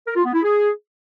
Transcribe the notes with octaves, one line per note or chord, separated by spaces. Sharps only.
A#4
F4
B3
E4
G#4